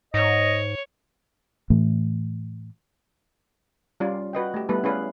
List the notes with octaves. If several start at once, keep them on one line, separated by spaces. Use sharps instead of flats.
G#2 C#5 D#5
A2 E3 A3
G3 C#4 F4 D5
F#4 B4 D#5 G5
A3 G4
G3 A3 B3 E4 B4
C#4 E4 G#4 B4 D5 F5